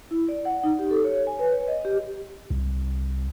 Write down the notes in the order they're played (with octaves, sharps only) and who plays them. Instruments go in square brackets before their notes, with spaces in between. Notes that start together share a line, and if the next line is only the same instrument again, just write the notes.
[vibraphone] E4
D5
F#5
D#4
G4
A4
C#5
G#5
B4
C#5
D#5
G4
[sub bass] C2